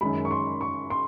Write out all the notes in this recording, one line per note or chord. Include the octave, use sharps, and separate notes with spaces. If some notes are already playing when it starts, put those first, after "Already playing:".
F#2 D#3 G#3 B5
C#6
C6
C#6
C6